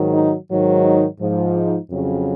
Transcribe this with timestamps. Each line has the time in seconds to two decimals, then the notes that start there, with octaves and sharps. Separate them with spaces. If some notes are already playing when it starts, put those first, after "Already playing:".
Already playing: G#2 D#3 F#3
0.12 D#4
0.49 G#2 D#3 F#3
0.84 D#4
1.20 G#2 F3
1.56 D#4
1.90 F2 C#3 F#3